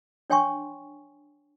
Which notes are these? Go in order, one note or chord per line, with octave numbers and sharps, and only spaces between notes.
D4 C#5 G5 G#5 C6 C#6